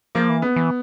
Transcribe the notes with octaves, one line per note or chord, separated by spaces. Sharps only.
F3 A#3
E3
B3
E3